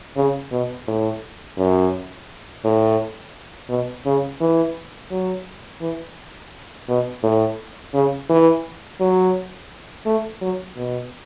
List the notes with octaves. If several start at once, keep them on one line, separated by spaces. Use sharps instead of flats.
C#3
B2
A2
F#2
A2
B2
C#3
E3
F#3
E3
B2
A2
C#3
E3
F#3
A3
F#3
B2